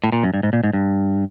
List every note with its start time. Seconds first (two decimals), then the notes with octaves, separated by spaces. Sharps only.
0.04 A2
0.12 A#2
0.23 F#2
0.34 G2
0.43 G#2
0.53 A#2
0.63 G#2
0.73 G2